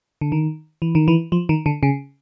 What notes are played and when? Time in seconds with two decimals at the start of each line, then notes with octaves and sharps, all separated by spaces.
0.21 D3
0.32 D#3
0.82 E3
0.95 D#3
1.08 E3
1.32 F3
1.49 D#3
1.66 D3
1.83 C#3